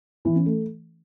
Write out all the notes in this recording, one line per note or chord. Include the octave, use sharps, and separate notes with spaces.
E3
C#4
A3